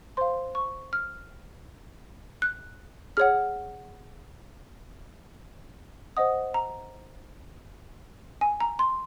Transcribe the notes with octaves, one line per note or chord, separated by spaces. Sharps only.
C5 F5 C6
C#6
F6
F#6
G#4 C#5 F#5 F6
C5 D#5 F#5 D#6
A#5
G#5
A#5
C6